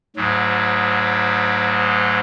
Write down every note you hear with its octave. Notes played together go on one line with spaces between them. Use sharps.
D2 G#2 F#3